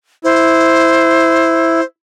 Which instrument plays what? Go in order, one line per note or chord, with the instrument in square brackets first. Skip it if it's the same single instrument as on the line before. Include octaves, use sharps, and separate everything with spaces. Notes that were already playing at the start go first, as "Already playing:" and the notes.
[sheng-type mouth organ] E4 [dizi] C5